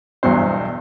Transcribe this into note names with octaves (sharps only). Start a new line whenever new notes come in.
B1 E2 G2 B2 C5